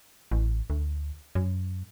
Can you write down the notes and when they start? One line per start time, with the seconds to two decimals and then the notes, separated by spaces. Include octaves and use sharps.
0.32 A1
0.70 D2
1.35 F#2